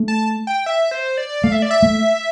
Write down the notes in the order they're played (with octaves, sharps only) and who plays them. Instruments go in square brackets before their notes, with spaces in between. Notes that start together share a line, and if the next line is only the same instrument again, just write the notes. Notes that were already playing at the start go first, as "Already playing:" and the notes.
Already playing: [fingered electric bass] A3
[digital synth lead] A5
G5
E5
C5
D5
[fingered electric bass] A3 [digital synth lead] F5
[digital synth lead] E5
D5
E5
[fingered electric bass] A3